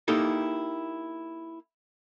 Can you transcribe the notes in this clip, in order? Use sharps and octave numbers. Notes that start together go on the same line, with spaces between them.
A#3 D#4 E4 G4 A4